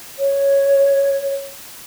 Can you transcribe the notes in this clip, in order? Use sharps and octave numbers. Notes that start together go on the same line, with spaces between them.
C#5